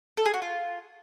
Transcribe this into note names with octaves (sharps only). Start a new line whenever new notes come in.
A4
G#4
F#4
F4